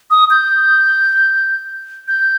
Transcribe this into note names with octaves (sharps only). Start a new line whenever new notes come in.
D#6
G6
G6